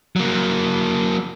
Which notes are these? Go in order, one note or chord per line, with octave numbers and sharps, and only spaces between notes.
F#3 A#3